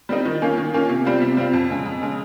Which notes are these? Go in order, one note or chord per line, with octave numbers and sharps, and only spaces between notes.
G3 C4 D#4
D#3
A#3 C#4 F4
D#3
A#3 C#4 F4
C3
G3 C4 F4
C3
G3 C4 F4
F2
C#3 G#3
F2
C#3 G#3